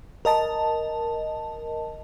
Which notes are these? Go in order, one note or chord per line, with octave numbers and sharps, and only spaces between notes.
A#4 D#5 A5